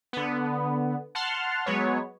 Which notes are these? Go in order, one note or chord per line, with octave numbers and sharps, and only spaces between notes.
D3 B3
F#5 A5 C6 F6
F#3 G#3 B3 C#5